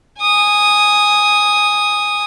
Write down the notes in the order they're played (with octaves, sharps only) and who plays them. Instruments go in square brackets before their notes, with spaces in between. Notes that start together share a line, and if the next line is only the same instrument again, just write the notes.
[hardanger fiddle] G#5 D#6